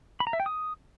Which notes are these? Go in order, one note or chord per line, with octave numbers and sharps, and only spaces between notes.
B5
A#5
E5
G5
D#6